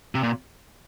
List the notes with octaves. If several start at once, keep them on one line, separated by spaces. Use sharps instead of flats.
C3
A#2